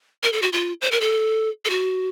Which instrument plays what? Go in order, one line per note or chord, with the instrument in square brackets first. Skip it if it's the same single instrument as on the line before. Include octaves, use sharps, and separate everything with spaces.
[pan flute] A#4
A4
F#4
F4
C5
A#4
A4
A4
F#4